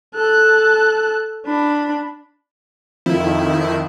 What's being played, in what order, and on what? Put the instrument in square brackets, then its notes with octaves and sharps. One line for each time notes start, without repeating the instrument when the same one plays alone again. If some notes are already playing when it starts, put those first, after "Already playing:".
[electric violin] A4 F#6
D4 B5
[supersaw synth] F2 D#3 [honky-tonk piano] F3 [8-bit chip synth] E4